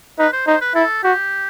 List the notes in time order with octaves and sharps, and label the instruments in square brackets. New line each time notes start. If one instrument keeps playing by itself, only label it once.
[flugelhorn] D#4 [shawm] B4
[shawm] C5
[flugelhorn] D#4 [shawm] C5
[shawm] B4
[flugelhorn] E4 [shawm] A4
[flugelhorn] F#4 [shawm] G4